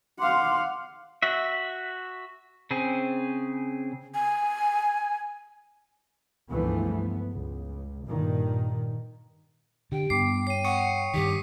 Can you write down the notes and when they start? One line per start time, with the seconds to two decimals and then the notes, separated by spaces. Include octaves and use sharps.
0.19 F5 F#5 C6 D6
1.22 F#4 E5
2.71 C#3 C4 G#4
4.14 G#5
6.51 C#2 G2 E3 F3 A3 B3
6.91 B3
7.31 C#2
8.07 G2 A#2 D#3
9.92 D3 G4 G5
10.10 G2 B3 D6 C7
10.47 C#5 G5 C7 D#7
10.64 F#5 C#6 D#6 C#7
11.14 G2 D#3 G4 B6